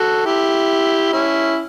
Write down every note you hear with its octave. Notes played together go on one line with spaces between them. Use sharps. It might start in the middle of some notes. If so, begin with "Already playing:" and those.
Already playing: F#4 A4
E4 G4
C#4 E4